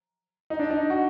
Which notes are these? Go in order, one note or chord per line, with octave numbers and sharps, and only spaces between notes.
D#4
D4
D#4
F#4